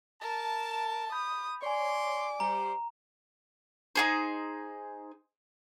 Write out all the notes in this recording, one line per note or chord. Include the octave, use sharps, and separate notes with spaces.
A#4 A5
B5 D#6 G6
C#5 D5 G#5 C6 D6
G3 C5 A#5
D#4 G#4 C5